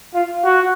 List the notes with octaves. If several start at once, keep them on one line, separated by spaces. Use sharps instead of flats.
F4
F#4